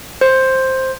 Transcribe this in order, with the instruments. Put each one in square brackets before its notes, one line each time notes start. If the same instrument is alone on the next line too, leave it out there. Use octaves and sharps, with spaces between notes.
[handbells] C5